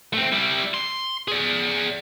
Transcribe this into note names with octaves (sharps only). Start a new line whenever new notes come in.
A3 C4
G3 E4
C6
G#4 D5